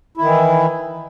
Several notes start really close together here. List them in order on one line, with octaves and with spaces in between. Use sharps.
E4 D#3 E3